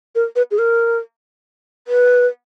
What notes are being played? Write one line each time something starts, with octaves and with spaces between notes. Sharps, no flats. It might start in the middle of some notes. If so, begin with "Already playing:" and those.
A#4
B4
G#4
A#4
B4